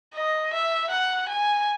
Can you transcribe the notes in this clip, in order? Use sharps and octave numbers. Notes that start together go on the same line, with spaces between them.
D#5
E5
F#5
G#5